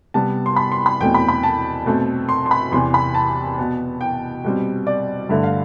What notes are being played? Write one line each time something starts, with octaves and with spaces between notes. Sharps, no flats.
C3 G3 B3 A5
C6
B5
C6
B5
E2 B2 A3 C4 G5
B5
B5
A5
B2 A3 C4
C6
C6
B5
E2 C3 E3 C6
B5
A5
B2 B3
G5
B2 G3 C4
D5
G2 D3 A3 E5
F5